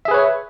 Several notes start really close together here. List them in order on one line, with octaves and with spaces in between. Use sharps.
E5 G#4 B4 C#5